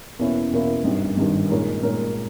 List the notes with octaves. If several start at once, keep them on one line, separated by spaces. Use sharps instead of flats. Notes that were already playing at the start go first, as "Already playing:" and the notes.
E2 B2 A#3 C#4 E4
E2 B2 A#3 C#4 E4
G#1 G2 D#3
G#1 G2 D#3
A#2 G#3 D#4 A#4 C#5
A#2 G#3 D#4 A#4 C#5